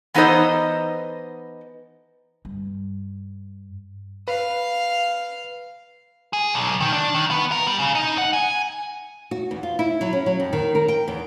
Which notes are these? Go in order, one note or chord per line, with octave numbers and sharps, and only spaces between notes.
E3 B3 D#4 A4 C5 D#5
G2
B4 F5
G#4
B1
D#3
D4
D#3
B3
A#4
G3
C#3
D#4
F#5
G#5
F#4
E2
F4
E4
F#3
C#4
F#3
F2
D#3
A#4
G5
E2